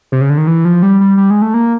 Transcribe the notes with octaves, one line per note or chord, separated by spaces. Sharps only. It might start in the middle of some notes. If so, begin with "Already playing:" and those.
C3
C#3
D3
D#3
E3
F3
G3
G3
G3
G#3
A3
A#3